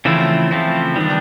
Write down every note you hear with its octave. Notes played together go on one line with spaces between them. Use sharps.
C#3 E3 F3 A3 C4 E4
C#3 F3 A3 C4 E4
D#3 G3 B3 D4